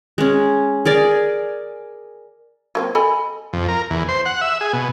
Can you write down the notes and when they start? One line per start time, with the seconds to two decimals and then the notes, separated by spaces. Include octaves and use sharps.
0.18 G#3 C#4
0.85 G#4 A#4 D5
2.75 F#3 A#3 C4
2.95 A4 D#5 G#5 B5
3.53 F2
3.68 A#4
3.90 E2
4.09 C5
4.25 F#5
4.41 E5
4.61 G#4
4.73 B2